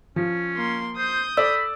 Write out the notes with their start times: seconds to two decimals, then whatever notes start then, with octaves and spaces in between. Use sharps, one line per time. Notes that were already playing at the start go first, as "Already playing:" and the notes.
0.16 F3 C#4
0.56 A#3 C6
0.97 C5 D#6 G6
1.37 A4 D5 B5 E6